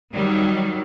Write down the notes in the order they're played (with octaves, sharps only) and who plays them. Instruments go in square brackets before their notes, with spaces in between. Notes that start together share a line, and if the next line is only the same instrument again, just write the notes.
[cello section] D#3 F#3 G3